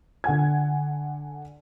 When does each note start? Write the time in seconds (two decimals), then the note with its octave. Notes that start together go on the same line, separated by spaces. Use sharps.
0.24 D3 F#5 G#5 G#6